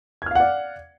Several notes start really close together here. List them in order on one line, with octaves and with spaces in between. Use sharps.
G#6 F6 F5 F#5 D5